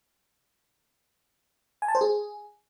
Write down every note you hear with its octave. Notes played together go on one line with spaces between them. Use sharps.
G#5
A5
C5
G#4